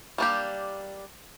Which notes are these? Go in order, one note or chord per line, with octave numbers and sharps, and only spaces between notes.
G3 A#3 D4 G4